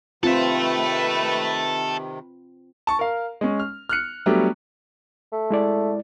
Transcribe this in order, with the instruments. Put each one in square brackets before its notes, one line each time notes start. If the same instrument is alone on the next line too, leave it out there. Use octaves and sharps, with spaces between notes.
[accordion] C3 D#3 [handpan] C4 F4 [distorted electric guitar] A4 E5 [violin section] B4
[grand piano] A5 C#6
A#4 F5
G#3 C#4
F6
F6 F#6 C#7
F#3 G3 A3 B3 D4
[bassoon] A3
[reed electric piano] G#3 E4 D5